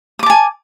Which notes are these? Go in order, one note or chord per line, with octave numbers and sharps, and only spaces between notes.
G#5 A5 D6 D#6